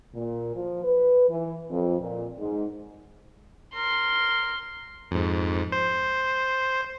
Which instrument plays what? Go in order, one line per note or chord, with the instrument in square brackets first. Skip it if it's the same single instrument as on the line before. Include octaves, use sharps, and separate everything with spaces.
[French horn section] A#2
F3
B4
E3
F2
A#2
G#2
[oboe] A#4 [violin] C6
[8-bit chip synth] F2 G#2
C5